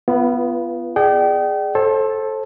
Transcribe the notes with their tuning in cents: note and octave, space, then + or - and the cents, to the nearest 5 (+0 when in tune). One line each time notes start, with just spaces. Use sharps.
B3 +5 F4 -30 B4 -20
G#4 +0 D5 +30 G5 -35
A4 -5 C5 +35